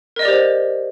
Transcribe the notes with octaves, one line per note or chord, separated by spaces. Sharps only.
G4 A#4 C5 D5 D#5